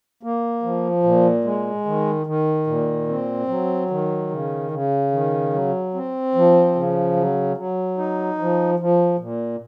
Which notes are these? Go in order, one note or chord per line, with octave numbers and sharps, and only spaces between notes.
A#3
F3
A#2
G#3
D#3
D#3
A#2
C4
F#3
D#3
C#3
C#3
D#3
F#3
C4
F3
C#3
F#3
F#3
D#4
F3
F3
A#2